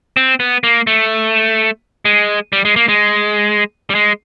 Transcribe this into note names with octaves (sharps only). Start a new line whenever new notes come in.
C4
B3
A#3
A3
G#3
G3
G#3
A#3
G#3
G3
G#3